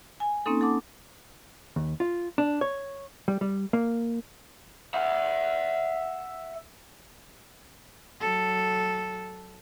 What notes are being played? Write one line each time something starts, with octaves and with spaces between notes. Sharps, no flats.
G#5
A#3 C4 C#4 D#4 A4
A4 F#5 A5 D6
D#2
F4
D4
C#5
G3
G3
A#3
E5 F#5
F#3 A4